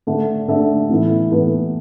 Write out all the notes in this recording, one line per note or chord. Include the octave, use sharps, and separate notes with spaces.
D3 A3 D4 A4 E5
D3 A3 D4 A4 E5
A2 E3 B3 E4 A4
A2 E3 B3 E4 A4